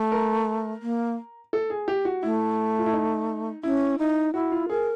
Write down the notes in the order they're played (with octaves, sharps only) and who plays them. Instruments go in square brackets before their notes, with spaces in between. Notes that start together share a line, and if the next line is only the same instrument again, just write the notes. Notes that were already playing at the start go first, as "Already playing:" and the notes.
Already playing: [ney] A3
[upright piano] A#4
[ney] A#3
[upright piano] A4
G#4
G4
F#4
[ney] A3 [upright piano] E4
[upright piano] F4
E4
D#4
[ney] C#4 [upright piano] E4
[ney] D#4 [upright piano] E4
[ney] E4 [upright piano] F#4
[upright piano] F4
[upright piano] G#4 [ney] A#4